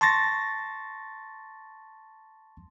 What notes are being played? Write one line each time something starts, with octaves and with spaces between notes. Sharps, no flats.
A5 C6 C#6 A6 A#6